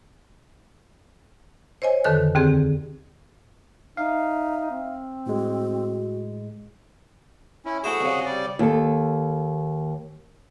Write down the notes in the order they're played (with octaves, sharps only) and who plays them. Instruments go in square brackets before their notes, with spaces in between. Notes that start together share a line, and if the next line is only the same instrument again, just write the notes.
[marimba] C5 C#5 D#5 G#5
F2 D3 D#3 A4 B4 F#6
D#2 D3 C4 G4 G#4
[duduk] D#4 [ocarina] E5 [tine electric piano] F5
[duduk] C4
[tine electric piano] A2 G#3 [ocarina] F#4
[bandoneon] C#4 E4
[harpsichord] A3 E4 C5 [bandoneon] F#4 G#4
[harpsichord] C2 C#3
[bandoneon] G3 D5
[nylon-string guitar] D#2 A4